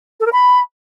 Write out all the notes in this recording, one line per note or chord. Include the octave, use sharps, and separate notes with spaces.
A4
A#4
B5